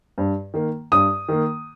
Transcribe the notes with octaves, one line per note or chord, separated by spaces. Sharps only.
G2
D#3 A#3
G2 D#6
D#3 A#3